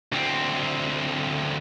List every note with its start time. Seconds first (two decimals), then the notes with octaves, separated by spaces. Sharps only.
0.12 D2 C4